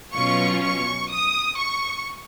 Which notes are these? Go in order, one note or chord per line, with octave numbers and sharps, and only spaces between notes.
B2 F#3 C#4 F4 C#6
C#6
D#6
C#6